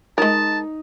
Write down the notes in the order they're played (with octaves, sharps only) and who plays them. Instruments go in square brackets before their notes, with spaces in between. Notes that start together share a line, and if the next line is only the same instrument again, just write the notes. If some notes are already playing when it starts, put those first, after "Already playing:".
[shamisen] G#3 A#4 [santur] D#4 [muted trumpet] A5